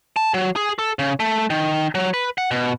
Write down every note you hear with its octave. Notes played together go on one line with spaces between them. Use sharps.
A5
F#3
G#4
A4
C#3
A3
D#3
F#3
B4
F#5
B2